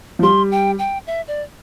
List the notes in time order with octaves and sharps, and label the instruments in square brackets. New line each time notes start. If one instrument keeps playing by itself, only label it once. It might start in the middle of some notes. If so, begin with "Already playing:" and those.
[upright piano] F3
[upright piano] G3 [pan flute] C6
[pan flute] G5
G5
E5
D5